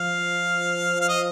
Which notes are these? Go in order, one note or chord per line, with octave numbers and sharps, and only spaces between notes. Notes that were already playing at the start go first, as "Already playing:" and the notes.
Already playing: F3 F5
F5
D#5